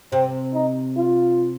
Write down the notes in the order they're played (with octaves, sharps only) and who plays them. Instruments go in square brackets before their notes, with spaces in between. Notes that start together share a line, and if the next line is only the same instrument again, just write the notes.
[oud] C3 [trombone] C4
[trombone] D#4
F4